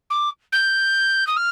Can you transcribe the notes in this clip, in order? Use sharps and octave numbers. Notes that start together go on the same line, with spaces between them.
D6
G6
D#6
F6